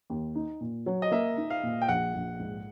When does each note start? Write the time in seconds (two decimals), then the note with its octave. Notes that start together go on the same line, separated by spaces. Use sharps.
0.10 D#2
0.35 D#4
0.61 A#2
0.86 F#3
1.02 D#5
1.11 A#3 E5
1.37 D#4
1.50 F5
1.63 A#2
1.82 G5
1.89 A#1 F#5
2.15 A#1
2.40 G#2